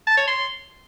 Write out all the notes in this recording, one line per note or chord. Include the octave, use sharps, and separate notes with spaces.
A5
C#5
C6